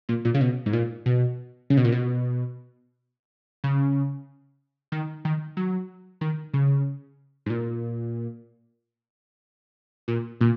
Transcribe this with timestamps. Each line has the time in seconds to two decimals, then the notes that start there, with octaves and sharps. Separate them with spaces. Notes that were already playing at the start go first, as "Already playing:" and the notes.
0.09 A#2
0.25 A#2
0.34 C#3
0.41 B2
0.66 G#2
0.73 A#2
1.06 B2
1.70 C#3
1.77 B2
1.85 A#2
1.92 B2
3.64 C#3
4.92 D#3
5.25 D#3
5.57 F#3
6.21 D#3
6.54 C#3
7.46 G#2
7.50 A#2
10.08 A#2
10.41 A#2